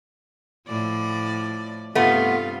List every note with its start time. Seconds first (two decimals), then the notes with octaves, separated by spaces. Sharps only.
0.68 A2 F3 D5
1.95 G2 C3 A3 B3 F4